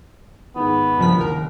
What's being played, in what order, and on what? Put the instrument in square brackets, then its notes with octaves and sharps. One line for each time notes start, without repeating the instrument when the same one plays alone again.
[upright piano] G#2 D#3 [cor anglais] B3
[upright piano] F#1 C2 [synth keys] G2 F3 B6
[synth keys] D#2 A#4